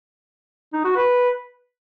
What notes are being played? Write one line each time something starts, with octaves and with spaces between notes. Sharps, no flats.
D#4
F#4
B4